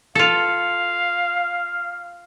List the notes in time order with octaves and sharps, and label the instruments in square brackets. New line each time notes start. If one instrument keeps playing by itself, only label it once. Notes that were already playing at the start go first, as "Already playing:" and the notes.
[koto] F4 A4 [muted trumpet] F5